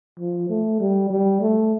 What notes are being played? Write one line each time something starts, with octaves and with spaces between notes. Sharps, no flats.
F3
A3
G3
G3
A3